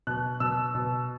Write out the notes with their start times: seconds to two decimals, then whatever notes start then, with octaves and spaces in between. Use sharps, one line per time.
0.07 B2 F#6
0.40 B2 E6
0.75 B2